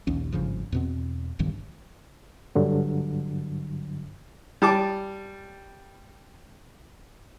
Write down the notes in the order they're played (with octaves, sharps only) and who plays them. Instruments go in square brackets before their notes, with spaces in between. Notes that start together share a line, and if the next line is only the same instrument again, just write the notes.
[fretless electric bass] A#1 D#2 C#4
G#1 G2 C#3 F3
E2 B2 C4
E1 B1 G2 D#3
[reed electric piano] G2 D3 F#3
[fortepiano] G3 A5 D6